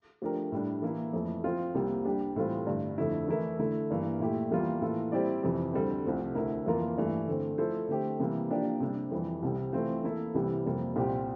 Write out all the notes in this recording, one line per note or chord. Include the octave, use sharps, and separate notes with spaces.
F3 A3 D4 G4 A#4
A2 G3 D4
E3 A#3 E4
F2 E3 A3
F3 C4 F4
C2 C3 G3 A#3
G3 D4 G4
A2 E3 G3 C4 F4
G2 D3 A3
F2 D3 A3 E4
E3 A3 E4 A#4 E5
D3 A3 E4
G2 E3 A#3
A#2 A3 E4 G4
E2 E3 G3 A#3 F4
A2 E3 A#3 F4 A4
G3 C4 E4 G4 D5
F2 C3 E3
D2 D3 G3 C4
C2 C3 F3 A3 C4
D2 D3 A3 E4 A#4
F2 E3 A#3 F4 A#4
G2 E3 A3
D3 A3 C4
F3 A3 E4 A4 C5
D3 A3 C4 G4 C5
C3 E3 G3 A#3
F3 A#3 D4 G4 D5
C3 G3 D4
F2 E3 G3
C2 C3 G3
E3 A3 C4 F4 C5
E3 A#3 E4 A4 E5
C2 C3 E3 G3
F2 C3 G3 A#3
C2 A#2 G3 C4 G4